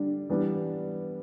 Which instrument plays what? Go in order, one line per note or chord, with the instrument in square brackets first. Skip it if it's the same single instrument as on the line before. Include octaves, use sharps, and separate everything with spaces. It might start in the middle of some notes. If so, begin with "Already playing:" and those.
Already playing: [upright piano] D3 G3 D4
E3 G3 B3 D4